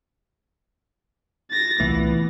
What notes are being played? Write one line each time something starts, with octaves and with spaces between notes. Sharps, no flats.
A6 A#6
C2 A#2 E3 A3 B3